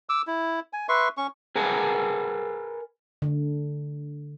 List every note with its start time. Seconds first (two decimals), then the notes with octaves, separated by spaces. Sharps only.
0.09 D6 E6
0.27 E4
0.73 G#5
0.89 B4 E5 C6 C#6
1.17 C#4 C#6
1.56 G#4 A#4 B4 F#5 G#5 A5
3.22 D3